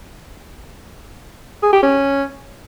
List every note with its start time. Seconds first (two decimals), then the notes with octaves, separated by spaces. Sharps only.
1.63 G#4
1.73 G4
1.83 C#4